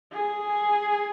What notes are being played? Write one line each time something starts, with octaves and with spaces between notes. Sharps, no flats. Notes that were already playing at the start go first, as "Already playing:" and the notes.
G#4